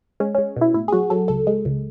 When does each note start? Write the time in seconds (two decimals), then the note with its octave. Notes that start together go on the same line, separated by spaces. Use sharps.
0.20 G#3 C#4
0.35 C#4
0.38 G#3
0.56 B2 E4
0.74 A2 E4
0.88 G#4
0.92 F#3 F#4
1.10 F#3 A4
1.28 C#2 A4
1.47 G#3
1.65 C#2